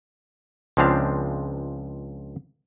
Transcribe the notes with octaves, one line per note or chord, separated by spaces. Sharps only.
C#2 F3 G#3 C4 D4 F5